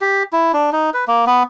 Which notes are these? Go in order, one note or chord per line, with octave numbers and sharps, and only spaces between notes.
G4
E4
D4
D#4
B4
A#3
B3